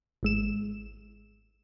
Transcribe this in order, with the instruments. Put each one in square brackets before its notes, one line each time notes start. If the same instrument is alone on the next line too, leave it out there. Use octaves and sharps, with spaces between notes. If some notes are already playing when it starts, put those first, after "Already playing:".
[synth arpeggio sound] G#1 G#3 E7